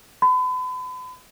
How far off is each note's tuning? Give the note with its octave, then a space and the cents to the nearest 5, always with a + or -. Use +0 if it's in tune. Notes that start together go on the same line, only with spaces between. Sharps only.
B5 +40